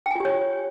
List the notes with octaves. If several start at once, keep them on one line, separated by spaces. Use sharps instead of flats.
F4 G4 C#5 G5 G#5